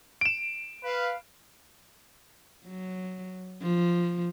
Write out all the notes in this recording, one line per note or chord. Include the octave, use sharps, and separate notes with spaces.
D7 E7
B4 F5
F#3
F3